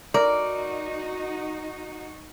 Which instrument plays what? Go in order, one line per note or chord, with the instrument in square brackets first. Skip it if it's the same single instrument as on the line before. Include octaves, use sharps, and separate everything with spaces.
[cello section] D#4 F#4 [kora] A#4 [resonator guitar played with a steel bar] D5